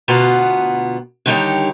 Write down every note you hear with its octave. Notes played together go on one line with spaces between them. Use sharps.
D2 B2 B3 F4 F#5 A#5
D3 D#3 G3 D#4 G4 C#5